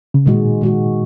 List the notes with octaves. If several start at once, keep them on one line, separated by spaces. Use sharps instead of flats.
C#3
A#2 D#3 G#3 F#4
D#3 G#3 F#4